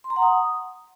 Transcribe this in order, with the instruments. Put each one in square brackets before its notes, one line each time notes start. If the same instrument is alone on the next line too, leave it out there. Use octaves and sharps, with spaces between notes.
[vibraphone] C6
A#5
F#5
D#6